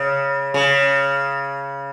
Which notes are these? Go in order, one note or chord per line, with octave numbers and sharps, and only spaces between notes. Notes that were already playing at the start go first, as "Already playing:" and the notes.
Already playing: C#3
C#3